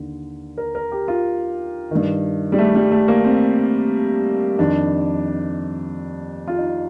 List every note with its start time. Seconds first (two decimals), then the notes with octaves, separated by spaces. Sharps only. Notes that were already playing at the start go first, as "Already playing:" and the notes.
Already playing: D#2 D3
0.58 A#4
0.75 A#4
0.92 G4
1.08 F4
1.91 G2 D#3
2.52 G3
2.59 A3
2.75 G3
2.92 A3
3.08 A#3
3.24 C4
4.58 F2 D#3 D4
6.47 F4
6.58 D#4